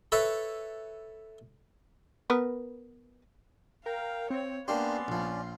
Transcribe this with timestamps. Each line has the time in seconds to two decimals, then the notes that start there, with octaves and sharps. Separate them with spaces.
0.12 A4 B4 C#5 E5
2.30 B3 A#4 B4
3.86 A#4 F5 G5
4.30 C4 C#5 G5
4.68 A#3 B3 C#4 D4 G4 D5 C6
5.08 A#1 F3